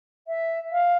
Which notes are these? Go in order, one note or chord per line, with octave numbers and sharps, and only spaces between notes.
E5
F5